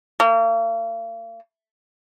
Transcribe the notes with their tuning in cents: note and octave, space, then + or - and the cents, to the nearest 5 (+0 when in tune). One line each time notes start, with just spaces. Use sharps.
A#3 -40